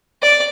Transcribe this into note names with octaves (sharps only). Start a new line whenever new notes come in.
D5